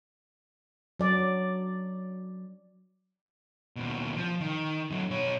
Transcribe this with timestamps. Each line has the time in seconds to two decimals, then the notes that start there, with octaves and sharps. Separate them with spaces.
1.00 F#3 D5
3.76 D#2 B2
4.16 F3
4.40 D#3
4.91 D3 F#3
5.10 B2 C#5